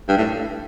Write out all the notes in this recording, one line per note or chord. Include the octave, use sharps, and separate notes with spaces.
G2
A2